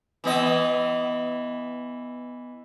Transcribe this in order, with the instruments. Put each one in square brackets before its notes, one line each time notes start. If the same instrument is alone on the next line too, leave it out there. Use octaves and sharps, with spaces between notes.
[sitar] E3 B3 D#5